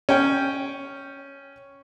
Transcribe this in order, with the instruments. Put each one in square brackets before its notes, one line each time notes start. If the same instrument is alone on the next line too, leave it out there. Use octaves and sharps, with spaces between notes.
[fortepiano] C#4 G5